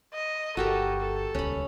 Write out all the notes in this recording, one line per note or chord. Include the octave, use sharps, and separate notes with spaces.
D#5
G1 F#4 G4 A4 A#4
A4
D#1 C#2 C#4 B5